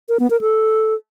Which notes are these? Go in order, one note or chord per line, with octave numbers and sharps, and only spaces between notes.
A#4
B3
A#4
A4